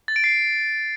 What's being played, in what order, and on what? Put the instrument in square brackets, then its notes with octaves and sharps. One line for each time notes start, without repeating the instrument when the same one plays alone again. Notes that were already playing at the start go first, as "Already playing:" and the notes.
[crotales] A6
D7
C7